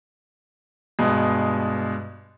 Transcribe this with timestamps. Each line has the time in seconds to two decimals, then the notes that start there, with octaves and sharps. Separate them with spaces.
0.99 G2 B2 G#3